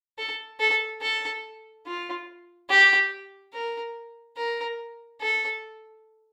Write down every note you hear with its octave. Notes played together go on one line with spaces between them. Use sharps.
A4
A4
A4
F4
G4
A#4
A#4
A4